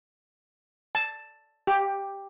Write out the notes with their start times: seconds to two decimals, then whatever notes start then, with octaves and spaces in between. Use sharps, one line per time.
0.95 A5
1.67 G4